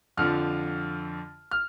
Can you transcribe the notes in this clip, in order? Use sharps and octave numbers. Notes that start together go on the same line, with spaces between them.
F2 D3 F3 F6
F6